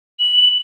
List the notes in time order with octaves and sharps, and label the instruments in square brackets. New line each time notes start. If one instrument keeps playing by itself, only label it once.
[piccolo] F#7